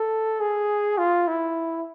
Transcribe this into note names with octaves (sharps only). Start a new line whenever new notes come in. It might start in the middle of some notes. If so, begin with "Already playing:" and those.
Already playing: A4
G#4
F4
E4